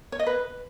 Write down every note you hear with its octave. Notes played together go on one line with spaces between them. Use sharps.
C#5
D#5
B4